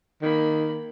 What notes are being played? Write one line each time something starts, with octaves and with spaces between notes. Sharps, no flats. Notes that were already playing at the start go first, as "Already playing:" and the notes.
D#3 A#3 B5